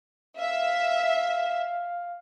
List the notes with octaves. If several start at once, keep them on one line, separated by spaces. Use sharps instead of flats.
E5 F5